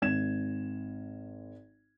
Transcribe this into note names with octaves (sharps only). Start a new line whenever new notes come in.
G#1 G#6 E7